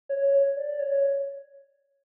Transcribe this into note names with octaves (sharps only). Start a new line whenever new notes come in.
C#5
C#5
D5
C#5